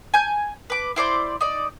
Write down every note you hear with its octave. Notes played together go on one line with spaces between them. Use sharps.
G#5 G6
B4 D6
E4 C5 D5 D6
D#4 D5